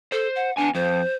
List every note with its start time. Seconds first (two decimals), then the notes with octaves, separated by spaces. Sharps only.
0.12 A4 C5
0.36 F#5
0.57 B3 D4 G#5
0.75 F2 C5